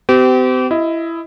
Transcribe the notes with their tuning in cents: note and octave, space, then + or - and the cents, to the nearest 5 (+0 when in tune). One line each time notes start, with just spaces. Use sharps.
C4 -40 G4 -30
E4 +15 D#5 +30